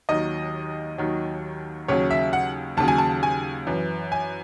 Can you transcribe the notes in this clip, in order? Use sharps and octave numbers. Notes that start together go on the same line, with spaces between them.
D#2 D#3 F#3 D#5
D#2 D#3 F#3
D#2 C#3 F#3 C#5
E5
F#5
D#2 C#3 F#3 A5
G#5
A5
G#5
F#2 E3
G#5